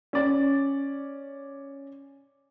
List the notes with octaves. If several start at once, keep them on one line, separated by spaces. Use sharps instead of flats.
C#4 D5